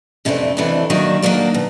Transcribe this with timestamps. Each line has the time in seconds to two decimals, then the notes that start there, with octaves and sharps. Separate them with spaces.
0.25 F2 C3 E3 A3 D4
0.57 F2 C3 E3 A3 D4
0.90 D#3 F#3 A#3 D4
1.22 D#3 F#3 A#3 D4
1.54 B2